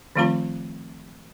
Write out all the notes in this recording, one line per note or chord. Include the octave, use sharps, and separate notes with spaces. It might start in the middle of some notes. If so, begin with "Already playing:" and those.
D#3 F3 A3 C4 F4 B5